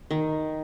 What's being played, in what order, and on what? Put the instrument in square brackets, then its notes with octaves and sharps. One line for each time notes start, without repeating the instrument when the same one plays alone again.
[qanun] D#3